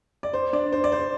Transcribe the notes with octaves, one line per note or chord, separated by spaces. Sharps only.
D5
C5
D4 D5
C5
D5
C5